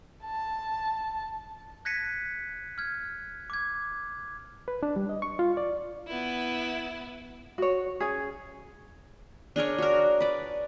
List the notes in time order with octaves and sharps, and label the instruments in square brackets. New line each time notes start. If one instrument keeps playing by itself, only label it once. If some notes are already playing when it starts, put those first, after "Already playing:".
[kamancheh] A5
[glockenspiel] F#6 G#6 A#6 B6 C#7 D#7
F6 G#6
D6 G#6
[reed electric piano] B4
D4
G3
D#5
C#6
F4
D5
[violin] B3 E4
[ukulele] F#4 C#5
C#4 G#4
[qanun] D4 G#4 A#4 C#5
F#4 A#4
B4 D5